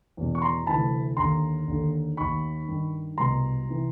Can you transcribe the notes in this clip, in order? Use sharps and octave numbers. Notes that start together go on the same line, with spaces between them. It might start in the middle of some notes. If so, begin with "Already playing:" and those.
E2 B2
C#6
A#5 C6
D2 C3 E3 A5 B5
D#2 D3 A#5 C6
D#2 D3
D#2 D#3 B5 C#6
G2 D#3
C2 B2 A#5 C6
C3 E3